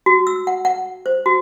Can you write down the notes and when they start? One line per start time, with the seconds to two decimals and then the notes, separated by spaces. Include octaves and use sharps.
0.06 F#4
0.27 E6
0.47 F#5
0.65 F#5
1.06 C5
1.26 F#4